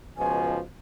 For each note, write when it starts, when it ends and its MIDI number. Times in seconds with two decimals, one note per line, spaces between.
0.17 0.59 37
0.17 0.59 47
0.17 0.59 53
0.17 0.55 80